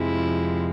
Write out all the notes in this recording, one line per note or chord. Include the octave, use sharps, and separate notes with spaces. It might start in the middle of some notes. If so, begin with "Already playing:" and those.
Already playing: F2 C3 F3 G#3 E4